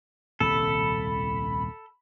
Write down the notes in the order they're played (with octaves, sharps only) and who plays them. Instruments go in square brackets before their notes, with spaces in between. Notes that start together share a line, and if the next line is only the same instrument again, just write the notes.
[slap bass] D#1 C2 A2 [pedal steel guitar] A4 [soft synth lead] B5